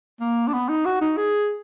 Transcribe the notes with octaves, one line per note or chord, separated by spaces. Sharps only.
A#3
D4
B3
D#4
F#4
D#4
G#4